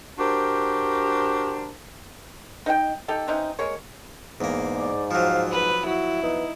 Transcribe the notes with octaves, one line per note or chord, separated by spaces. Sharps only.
D4 F#4 G4 A#4 C5
D#4 D#5 F#5 G5
D#4 G4 A4
E3 C4 C#4 D#4
G#3 A#3 C#5
E2 G#2 A#3
D5
F3 F#3 F5
B4 B5
E4 F#4
B3 D#4